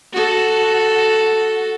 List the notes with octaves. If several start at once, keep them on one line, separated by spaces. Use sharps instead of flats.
F#4 A4